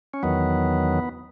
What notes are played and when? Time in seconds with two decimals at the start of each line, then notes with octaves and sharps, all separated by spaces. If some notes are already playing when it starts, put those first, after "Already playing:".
0.14 C#4
0.23 E2 D#3 F#3 B3